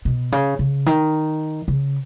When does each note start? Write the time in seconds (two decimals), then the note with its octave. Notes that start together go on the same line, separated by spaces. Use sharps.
0.05 B2
0.32 C#3
0.59 C#3
0.86 D#3
1.68 C#3